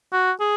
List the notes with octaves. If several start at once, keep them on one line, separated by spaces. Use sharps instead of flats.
F#4
G#4